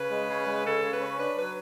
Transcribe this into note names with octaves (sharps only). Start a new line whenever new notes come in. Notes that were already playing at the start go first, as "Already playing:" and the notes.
Already playing: C#3 B4
G#3
C#3
G#3
C#3 A4
C#3
B4
C#4
D4 B4
F#3 B4